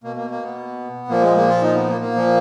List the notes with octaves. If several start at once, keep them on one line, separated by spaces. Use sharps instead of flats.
B2 A#3
A#3
A#3
B3
A#2 F3 A#3
G#3
A#3
F4
D#4
B3
A#3
A#3
A#2 F3